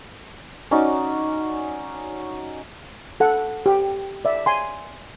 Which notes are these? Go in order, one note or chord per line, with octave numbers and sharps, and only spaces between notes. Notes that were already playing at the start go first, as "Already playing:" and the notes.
C#4 D#4 F#4 D5
A4 F#5
G4
D5 E5
G#5 C6